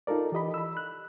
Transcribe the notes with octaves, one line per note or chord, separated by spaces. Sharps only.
D#4 F4 A4 A#4 D5
E3 G4 D#5 B5
B5 E6
F#6